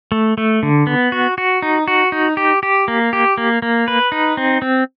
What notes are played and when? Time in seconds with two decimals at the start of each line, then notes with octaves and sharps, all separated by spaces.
0.12 A3
0.38 A3
0.63 D3
0.87 B3
1.12 F#4
1.38 F#4
1.62 D#4
1.88 F#4
2.12 D#4
2.37 G4
2.63 G4
2.88 A#3
3.13 G4
3.38 A#3
3.62 A#3
3.88 B4
4.12 D#4
4.37 C4
4.62 C4